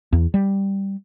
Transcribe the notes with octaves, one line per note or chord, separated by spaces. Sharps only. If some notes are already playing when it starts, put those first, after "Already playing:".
E2
G3